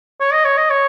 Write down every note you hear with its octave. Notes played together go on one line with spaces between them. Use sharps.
C#5
D#5
C#5
D#5
C#5